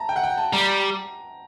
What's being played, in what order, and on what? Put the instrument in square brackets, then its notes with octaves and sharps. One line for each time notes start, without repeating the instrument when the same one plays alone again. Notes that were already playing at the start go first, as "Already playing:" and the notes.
Already playing: [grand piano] A5 A#5
G5
F#5
G5
A5
[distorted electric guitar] G3 [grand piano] A#5